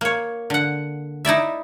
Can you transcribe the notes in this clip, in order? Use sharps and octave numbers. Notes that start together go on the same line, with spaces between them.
A#3 C#5
D3 F#5
D#4 E4 D5 E5